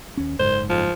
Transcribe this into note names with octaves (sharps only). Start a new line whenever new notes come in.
D#2 C#4
F#1 G#2 C5
F3